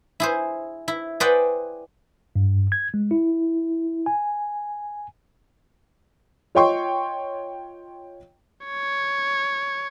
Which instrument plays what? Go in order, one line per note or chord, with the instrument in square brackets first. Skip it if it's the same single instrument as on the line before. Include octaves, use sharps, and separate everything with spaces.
[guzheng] E4 G#4 C5
E4
G#4 B4 C5 D5 F#5 G5
[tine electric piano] G2
G#6
G#3
E4
G#5
[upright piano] F4 C#5 D#5 G5 C6 C#6
[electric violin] C#5